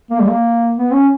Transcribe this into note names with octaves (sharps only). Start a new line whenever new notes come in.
A#3
G3
A#3
B3
C#4